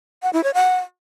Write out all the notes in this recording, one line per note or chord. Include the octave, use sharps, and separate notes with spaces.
F#5
E4
C#5
F#5